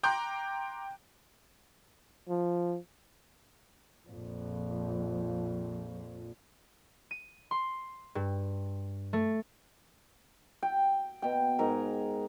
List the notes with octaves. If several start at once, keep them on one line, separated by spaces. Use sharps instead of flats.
G5 A#5 C6 D6 F#6 G6
F3
A#1 F2
D#7
C6
G2
A3
G5
B2 G5
G#2 A#4